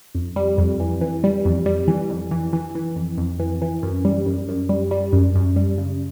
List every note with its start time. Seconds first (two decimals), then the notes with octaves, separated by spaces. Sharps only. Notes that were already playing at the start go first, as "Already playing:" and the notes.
0.15 F2
0.36 G3
0.58 F2
0.80 E3
1.01 E3
1.24 G3
1.45 F2
1.66 G3
1.88 E3
2.09 F2
2.31 E3
2.53 E3
2.75 E3
2.96 F2
3.18 F2
3.40 E3
3.62 E3
3.83 F#2
4.05 G3
4.26 F#2
4.49 F#2
4.69 G3
4.91 G3
5.13 F#2
5.35 F#2
5.56 G3
5.78 C#3